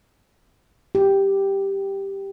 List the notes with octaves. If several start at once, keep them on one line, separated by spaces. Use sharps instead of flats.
G4